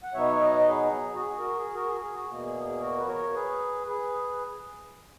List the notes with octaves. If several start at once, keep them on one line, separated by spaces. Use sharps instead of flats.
F#5
B2 F#3 B3 D#4 C#5 E5
E5
B4 D#5
G#4
F#4
G#4
F#4 A#4
G#4
F#4 A#4
G#4
G#4
F#4
E2 B2 A#3
G#4
G#4
F#4 A#4
B4
A#4 C#5
G#4 B4
G#4 B4